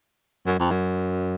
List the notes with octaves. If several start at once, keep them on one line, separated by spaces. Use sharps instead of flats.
F#2
F2
F#2